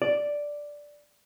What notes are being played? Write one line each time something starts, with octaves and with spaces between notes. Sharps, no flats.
D5